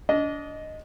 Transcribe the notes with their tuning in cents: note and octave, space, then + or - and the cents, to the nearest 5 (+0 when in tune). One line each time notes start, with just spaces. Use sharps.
D4 -30 D#5 +0